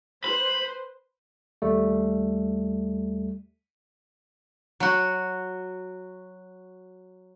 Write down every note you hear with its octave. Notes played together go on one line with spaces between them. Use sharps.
B4 C5 B5
D#2 G3 A3
F#3 F#4